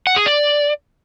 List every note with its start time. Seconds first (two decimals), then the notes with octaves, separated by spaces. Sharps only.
0.07 F#5
0.16 G#4
0.26 D5